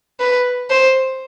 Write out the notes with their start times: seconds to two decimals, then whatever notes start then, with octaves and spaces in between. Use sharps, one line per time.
0.20 B4
0.70 C5